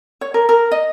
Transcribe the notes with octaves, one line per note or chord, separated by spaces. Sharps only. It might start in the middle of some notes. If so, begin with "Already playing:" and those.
C#5
A#4
A#4
D#5